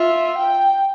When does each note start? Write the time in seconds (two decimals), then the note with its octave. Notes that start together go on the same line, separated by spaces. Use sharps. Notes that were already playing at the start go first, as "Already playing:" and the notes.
Already playing: F4 E5
0.38 G5